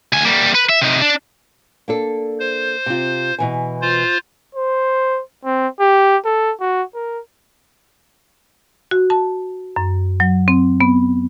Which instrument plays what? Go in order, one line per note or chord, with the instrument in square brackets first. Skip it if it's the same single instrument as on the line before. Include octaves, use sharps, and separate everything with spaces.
[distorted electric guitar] D2 G#5
G3 A#3
B4
E5
C3 D#4
D4
[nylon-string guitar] A#3 D4 A4
[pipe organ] C5
[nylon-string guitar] C3 F4
B2 E3 G#5
[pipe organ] F4 C5
[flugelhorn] C5
C4
G4
A4
F#4
A#4
[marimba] F#4
A5
F#2
F#3
C4
B3